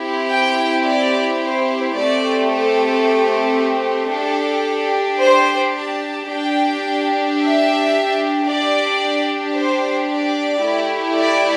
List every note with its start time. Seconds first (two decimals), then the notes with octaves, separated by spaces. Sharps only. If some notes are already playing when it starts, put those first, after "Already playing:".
Already playing: C4 E4 G4
0.33 G5
0.87 D5
1.42 C5
1.96 A3 C4 G4 D5
2.50 A4
4.13 D4 G4 A4
5.21 C5
5.75 A5
6.29 D4 G4 G5
7.38 E5
8.46 D4 G4 D5
9.55 C5
10.09 D5
10.63 A3 E4 G4
11.17 D5